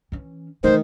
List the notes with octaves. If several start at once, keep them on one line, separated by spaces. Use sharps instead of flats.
E3 C#4
D#3 E3 A3 C5